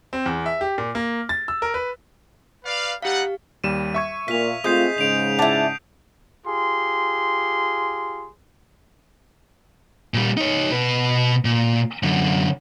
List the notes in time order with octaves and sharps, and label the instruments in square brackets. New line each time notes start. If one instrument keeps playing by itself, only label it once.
[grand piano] C4
E2
E5
G4
A#2
A#3
A6
E6
A#4
B4
[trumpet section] B4 D5 F5
[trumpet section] G3 D#4 F#5 [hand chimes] G4 F5
[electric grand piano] D#2 G3 E7 [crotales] D#7
[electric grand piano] E5 C#6 G#6
[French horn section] A#2 [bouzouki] F5 [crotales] B6 F7
[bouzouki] G#3 [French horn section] A3 C4 F4 [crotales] D#6 G6 C7
[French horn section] G#2 C#3 [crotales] D7 F7
[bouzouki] E4 D5 [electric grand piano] F#5 A5
[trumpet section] F4 G4 G#4 C6
[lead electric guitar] A#2 G3
D#4 C#5
B2 B4
A#2
F#2 D3